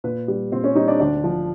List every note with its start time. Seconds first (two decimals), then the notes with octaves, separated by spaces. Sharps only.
0.04 A#2 B4
0.28 G3
0.52 A#2 C4 C5
0.64 C#4 C#5
0.75 G3 D#4 D#5
0.88 D4 D5
1.00 D2 D4 D5
1.24 D3 F3